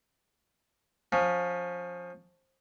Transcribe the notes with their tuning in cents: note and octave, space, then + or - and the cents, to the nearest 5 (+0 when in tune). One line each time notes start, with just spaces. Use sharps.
F3 +20 C#4 +0